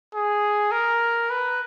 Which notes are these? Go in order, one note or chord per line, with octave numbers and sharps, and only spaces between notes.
G#4
A#4
B4